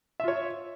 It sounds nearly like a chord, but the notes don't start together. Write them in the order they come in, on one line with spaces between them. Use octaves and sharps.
E5 F4 C#5